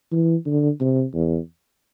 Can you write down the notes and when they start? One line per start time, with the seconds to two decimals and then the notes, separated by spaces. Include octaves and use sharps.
0.12 E3
0.46 D3
0.80 C3
1.14 E2